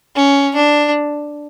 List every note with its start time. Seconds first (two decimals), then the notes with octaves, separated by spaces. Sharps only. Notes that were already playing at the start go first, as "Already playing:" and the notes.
0.16 C#4
0.55 D4